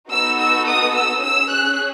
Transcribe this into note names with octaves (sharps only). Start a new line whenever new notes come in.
B3 D#4 F#4 A4 E6
E6
D#6
E6
C#4 G#4 E6
F#6